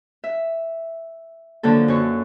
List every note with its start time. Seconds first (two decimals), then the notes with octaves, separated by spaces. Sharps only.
0.24 E5
1.63 D3 F3 F#3 A#3 A4
1.88 F#2 C#5